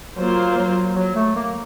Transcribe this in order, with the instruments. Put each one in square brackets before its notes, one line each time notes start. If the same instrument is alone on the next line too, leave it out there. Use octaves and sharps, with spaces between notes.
[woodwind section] F#3 [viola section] A#3 F4 C5
[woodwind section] F#3
F#3
A3
A#3